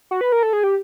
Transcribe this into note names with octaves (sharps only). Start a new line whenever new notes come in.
F#4
B4
A#4
A4
G#4
G4